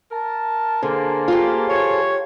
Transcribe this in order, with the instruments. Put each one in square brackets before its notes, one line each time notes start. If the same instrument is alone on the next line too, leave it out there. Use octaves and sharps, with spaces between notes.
[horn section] A#4 A5
[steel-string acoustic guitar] D3 [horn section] A#3 [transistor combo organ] G#4 A4 C5
[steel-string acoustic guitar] F4 G4
[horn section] C#5